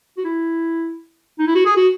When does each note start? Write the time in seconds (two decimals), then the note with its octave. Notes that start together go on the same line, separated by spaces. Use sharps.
0.17 F#4
0.24 E4
1.39 D#4
1.47 E4
1.55 F#4
1.66 G#4
1.77 F#4